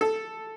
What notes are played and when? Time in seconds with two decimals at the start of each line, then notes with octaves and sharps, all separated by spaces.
0.01 A4